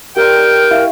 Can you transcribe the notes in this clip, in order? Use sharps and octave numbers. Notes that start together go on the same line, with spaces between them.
G4 A#4 D5 G5 C6
D#6
E4 F5 C#6